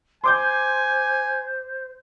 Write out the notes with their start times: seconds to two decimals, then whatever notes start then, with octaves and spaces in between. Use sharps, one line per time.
0.24 C5 G#5 C6 D6 G6